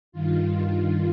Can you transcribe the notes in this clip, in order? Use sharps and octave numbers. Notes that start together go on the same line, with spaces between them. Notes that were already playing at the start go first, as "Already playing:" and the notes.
G2 D#3 F4
F4